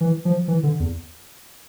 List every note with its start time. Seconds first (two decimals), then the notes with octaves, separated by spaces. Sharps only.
0.01 E3
0.25 F3
0.48 E3
0.63 D3
0.80 E2